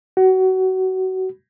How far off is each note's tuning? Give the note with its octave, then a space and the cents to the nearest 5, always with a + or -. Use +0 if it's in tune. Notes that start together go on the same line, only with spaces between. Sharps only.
F#4 +25